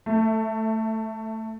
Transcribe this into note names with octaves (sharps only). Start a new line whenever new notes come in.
A3